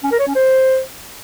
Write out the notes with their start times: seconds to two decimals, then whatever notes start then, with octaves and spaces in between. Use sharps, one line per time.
0.03 C#4
0.11 A#4
0.19 C#5
0.27 C#4
0.35 C5